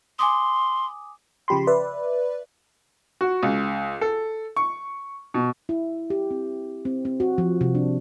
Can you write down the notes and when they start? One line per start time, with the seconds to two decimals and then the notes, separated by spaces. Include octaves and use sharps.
0.19 G#5 C6 D6 D#6
1.48 C#3 F3 G4 B5 C6
1.67 B4 D5 E5
3.21 F#4
3.43 C#2
4.01 A4
4.56 C#6
5.34 B2
5.69 E4
6.10 G4
6.31 C4
6.85 C4
7.05 C4
7.20 F#4
7.38 F3
7.61 C3
7.75 D4